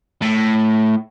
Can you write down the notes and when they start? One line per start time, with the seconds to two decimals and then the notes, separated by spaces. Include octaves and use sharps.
0.22 A2